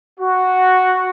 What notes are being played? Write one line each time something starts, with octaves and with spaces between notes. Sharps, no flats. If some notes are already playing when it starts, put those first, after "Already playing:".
F#4